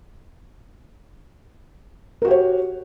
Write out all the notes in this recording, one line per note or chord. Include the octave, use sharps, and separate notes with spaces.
F#4 G4 A#4 C#5